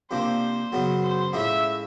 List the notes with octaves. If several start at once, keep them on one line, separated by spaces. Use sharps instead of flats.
C3 F3 A#3 D4 C5
F#2 C#3 F#3 B3
C5
A2 F3 G#3 C#4 E4 E5